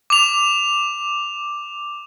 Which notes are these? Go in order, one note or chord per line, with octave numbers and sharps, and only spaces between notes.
D6 F7